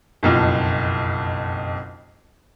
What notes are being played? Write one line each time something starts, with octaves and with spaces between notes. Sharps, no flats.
F#1 B1 F2